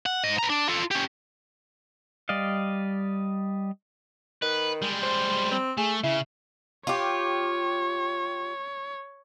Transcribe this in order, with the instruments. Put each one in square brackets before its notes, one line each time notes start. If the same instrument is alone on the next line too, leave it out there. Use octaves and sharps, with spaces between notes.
[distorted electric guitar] F#5
G#2 D#5
B4 A#5
D4
F4 A4
C#4 G4
[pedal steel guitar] G3 D5 D#5 F5
[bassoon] D#3 [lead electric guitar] B4
[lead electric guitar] G3 G#3
[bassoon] C5
C4
[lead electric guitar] A3 [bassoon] G#4
[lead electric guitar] C#3 [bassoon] E4
[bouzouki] F4 G4 [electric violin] C#5